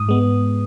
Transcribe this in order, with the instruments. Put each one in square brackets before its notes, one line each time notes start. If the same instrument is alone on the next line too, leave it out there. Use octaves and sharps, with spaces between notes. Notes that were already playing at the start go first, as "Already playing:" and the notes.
Already playing: [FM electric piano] G#2 D#6
G#3 B3